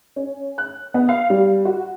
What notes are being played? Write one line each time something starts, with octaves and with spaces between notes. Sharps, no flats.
C#4
F#6
B3
F5
G3
F#4